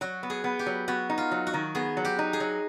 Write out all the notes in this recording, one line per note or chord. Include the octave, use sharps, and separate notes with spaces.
F#3 F#4
B3
G#4
B3
G4
F#3
B3 F#4
D#4
F4
F#3
F#4
D#3
B3 G#4
F#3
G4
D#4
G#4
F#3